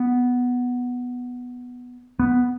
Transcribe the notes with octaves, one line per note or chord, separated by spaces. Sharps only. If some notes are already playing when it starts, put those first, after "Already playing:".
Already playing: B3
B3